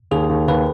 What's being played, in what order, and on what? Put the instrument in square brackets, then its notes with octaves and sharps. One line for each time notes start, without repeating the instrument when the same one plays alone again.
[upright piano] D#2 [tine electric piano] G#4
[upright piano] D#2
[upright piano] D#2 [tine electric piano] B4